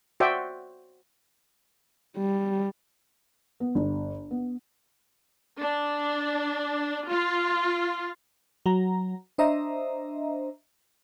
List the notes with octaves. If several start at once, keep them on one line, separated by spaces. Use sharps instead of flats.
F#4 C5 D5 E5 G5
G3
B3
G1
B3
D4
F4
F#3 A#5
D4 C5 D#5 E5 A#5